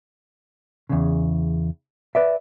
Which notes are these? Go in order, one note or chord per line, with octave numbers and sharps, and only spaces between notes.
E2 C#3
B4 D5 E5